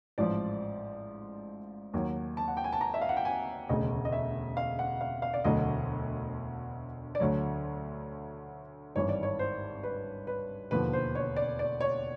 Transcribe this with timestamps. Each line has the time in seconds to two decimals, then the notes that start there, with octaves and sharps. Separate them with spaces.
0.18 A1 G#2 F3 D5
1.94 D#2 D#3 F#3
2.37 A5
2.48 F#5
2.57 G5
2.64 G#5
2.73 A5
2.81 A#5
2.94 E5
3.01 F5
3.09 F#5
3.17 G5
3.25 G#5
3.69 E1 D2 C#3 D#5
4.05 D#5
4.12 E5
4.57 F5
4.79 F#5
5.01 F5
5.22 F5
5.34 D5
5.44 E1 D2 D3 F#3 D#5
7.15 D5
7.20 D2 D3 F#3 C#5
8.95 G#1 G2 E3 C#5
9.09 D5
9.23 C#5
9.39 C5
9.83 B4
10.27 B4
10.71 E1 D#2 D3 F3 B4
10.93 C5
11.15 C#5
11.36 D5
11.59 D5
11.81 C#5